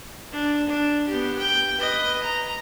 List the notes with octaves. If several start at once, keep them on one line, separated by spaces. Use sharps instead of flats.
D4
D4
B3 G4
G5
B4 D#5
A#5